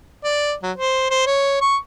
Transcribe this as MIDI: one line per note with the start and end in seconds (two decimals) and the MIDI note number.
0.24 0.53 74
0.63 0.72 54
0.77 1.06 72
1.11 1.23 72
1.26 1.58 73
1.61 1.77 85